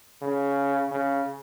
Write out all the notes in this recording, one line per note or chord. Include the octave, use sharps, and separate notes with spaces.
C#3
C#3